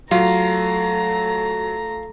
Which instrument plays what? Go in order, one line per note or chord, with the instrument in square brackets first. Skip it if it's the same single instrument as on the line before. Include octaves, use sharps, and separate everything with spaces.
[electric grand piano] F#3 [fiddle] A3 A#5 [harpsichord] F4